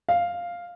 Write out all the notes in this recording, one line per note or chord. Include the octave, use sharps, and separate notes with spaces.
F5